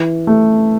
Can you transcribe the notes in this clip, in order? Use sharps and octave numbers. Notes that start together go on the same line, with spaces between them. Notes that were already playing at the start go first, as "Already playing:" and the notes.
Already playing: E3
A3